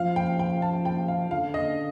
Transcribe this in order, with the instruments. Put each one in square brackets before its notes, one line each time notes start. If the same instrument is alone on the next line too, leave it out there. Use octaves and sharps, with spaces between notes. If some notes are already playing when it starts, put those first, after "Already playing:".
Already playing: [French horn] F3 [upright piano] F5
[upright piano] G5
G5
A5
G5
F5
[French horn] D3 [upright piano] F5
[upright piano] D#5